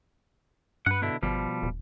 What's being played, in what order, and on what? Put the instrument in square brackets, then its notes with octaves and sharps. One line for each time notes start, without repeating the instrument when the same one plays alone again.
[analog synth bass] G2 [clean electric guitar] B4 F#5
[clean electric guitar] B2 D3 E4
[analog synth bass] G#1 [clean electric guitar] B2 F3 G3
[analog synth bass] D#1